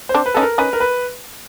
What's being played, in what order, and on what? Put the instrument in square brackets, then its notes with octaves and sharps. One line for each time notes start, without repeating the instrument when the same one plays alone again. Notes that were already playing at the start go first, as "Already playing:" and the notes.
[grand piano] C5
[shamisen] C4 D4
[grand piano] B4
[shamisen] C#4 D#4 [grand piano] A4
[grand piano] A#4
[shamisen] C#4 D#4 [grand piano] B4
[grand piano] A#4
B4